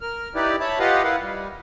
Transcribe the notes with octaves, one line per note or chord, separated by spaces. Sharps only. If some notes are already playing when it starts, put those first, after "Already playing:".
A#4 F6
D#4 E4 G4 B4 D5
C#5 E5 A5 B5
F4 G4 B4 D#5 F5 F#5
E4 A#4 B4 F5 F#5
G3